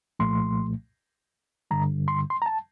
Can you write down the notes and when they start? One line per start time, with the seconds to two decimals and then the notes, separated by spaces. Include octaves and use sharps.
0.19 C2 A#2 F3 A3 C6
1.71 G2 D3 G3 A#5
2.08 C6
2.30 C6
2.42 A#5
2.46 A5